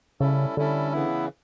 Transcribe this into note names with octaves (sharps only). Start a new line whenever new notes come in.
C#3 G3 C#4 E4 A4
D3 G3 C#4 E4 A4
C#3 E3 B3 E4